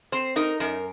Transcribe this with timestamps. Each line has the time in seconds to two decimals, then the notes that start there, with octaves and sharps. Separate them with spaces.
0.12 C4 C5
0.36 D#4 A#4
0.60 F#2 A#4